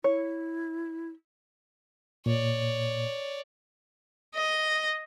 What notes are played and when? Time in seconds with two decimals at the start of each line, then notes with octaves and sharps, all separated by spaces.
0.04 E4 C#5
2.26 A#2 C#5 D5
4.35 D#5